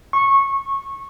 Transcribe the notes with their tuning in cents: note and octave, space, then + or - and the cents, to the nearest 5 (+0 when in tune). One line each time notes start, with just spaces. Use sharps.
C#6 -15